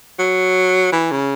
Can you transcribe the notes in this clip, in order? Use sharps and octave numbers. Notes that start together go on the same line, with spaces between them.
F#3
E3
C#3